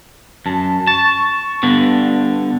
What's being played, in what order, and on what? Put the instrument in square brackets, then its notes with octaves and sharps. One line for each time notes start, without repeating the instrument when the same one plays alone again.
[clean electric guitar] F#2 [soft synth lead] A5
[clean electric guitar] A5 [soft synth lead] C#6
[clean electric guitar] G2 D3 [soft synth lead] B3